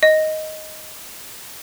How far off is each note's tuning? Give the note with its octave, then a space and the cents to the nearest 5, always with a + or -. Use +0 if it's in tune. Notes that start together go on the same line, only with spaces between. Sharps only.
D#5 +5